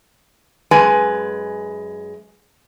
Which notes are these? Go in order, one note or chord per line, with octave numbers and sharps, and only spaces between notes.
F#2 G#3 B4 G#5